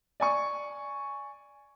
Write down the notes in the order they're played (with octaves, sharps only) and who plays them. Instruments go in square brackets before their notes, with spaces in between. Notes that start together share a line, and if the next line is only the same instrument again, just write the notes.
[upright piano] D5 G#5 C#6